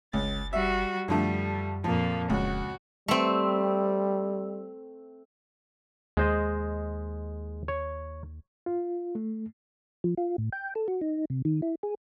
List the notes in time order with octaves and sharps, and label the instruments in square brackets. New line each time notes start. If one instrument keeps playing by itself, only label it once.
[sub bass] F#1 [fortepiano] C#2 [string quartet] A6
[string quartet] G3 F#4 [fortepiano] E5
[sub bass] F#2 [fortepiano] D3 F3 A3 [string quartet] G3
[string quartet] F2 A#2 A#3 [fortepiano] F3
[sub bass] D#1 [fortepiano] C#2 [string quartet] F#4
[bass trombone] G3 [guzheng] A3 C4
[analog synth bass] D#2 [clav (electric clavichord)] G#3 C5 D#5
[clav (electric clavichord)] C#5
[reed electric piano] F4
A3
[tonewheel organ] F3
F4
A2
G5
A4
F#4
D#4
C3
D#3
E4
G#4